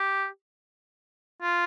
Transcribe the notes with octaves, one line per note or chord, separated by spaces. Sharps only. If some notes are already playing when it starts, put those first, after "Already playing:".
Already playing: G4
F4